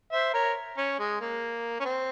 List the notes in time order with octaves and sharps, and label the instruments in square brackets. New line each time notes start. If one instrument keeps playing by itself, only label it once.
[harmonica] C5 E5
A#4 C#5
C#4
G#3
A#3
C#4
C4